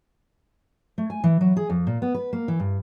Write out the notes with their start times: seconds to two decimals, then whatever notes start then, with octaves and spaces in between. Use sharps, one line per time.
0.98 A3
1.10 G#5
1.24 E3
1.41 F#3
1.57 G#4
1.70 F2
1.87 A#2
2.02 B3
2.14 B4
2.33 A#3
2.48 E3
2.60 G2